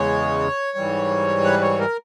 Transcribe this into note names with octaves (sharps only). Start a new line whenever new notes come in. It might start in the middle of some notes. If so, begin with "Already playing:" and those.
Already playing: E2 C#3 G#3 C#5
G#2 E3 G3
B4
C#5
A#4